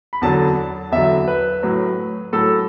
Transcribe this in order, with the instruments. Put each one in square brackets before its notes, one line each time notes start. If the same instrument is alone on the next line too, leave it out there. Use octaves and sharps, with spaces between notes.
[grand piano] B5
E2 D3 F#3 A5
E2 D3 F#3 E5
B4
A2 F#3
A2 F#3 A4